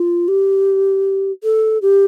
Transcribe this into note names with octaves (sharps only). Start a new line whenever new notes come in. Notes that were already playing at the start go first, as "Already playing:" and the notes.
Already playing: F4
G4
A4
G4